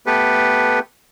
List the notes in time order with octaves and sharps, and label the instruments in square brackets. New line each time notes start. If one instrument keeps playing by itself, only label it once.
[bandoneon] A3 B3 G4 A4 B4